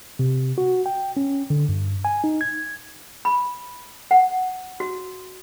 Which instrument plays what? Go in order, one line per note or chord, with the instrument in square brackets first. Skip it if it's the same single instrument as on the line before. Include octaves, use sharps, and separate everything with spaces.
[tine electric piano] C3
F#4
G5
C#4
D3
G2
G#5
D#4
G#6
[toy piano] B5
F#5
F#4